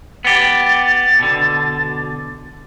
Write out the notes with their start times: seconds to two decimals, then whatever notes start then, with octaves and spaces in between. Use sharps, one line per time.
0.25 B3 G4 A6
1.19 B2 D3